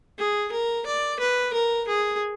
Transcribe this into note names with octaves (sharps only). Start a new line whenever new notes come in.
G#4
A#4
D5
B4
A#4
G#4